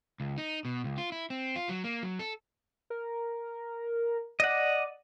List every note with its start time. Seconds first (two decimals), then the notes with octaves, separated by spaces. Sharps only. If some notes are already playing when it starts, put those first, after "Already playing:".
0.20 C#2
0.38 D#4
0.65 B2
0.84 C#2
0.98 F4
1.12 E4
1.30 C4
1.56 F4
1.69 F#3
1.84 A#3
2.03 F#3
2.19 A4
2.90 A#4
4.40 D5 D#5 F#5